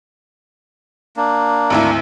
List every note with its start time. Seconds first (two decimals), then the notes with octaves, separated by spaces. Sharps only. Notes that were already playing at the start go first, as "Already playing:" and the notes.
1.17 A#3 D4
1.70 G#1 D2 E4